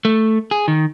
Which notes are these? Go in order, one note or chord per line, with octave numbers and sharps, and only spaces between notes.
A3
G#4
D#3